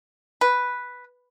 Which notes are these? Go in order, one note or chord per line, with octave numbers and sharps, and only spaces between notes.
B4